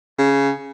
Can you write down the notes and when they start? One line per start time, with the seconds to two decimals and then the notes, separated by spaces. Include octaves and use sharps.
0.18 C#3